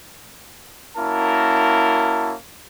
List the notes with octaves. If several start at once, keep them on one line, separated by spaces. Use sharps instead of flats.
A#3 C#4 E4 F#4 A#4 A5